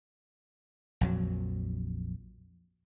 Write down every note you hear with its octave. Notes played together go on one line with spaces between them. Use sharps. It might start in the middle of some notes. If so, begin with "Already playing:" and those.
A#1 F2 F#3